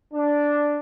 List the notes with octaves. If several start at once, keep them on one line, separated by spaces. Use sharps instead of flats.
D4